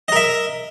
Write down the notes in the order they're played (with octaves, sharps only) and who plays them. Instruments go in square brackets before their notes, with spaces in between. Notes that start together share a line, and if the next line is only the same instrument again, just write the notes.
[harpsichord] D#5
A#4
E5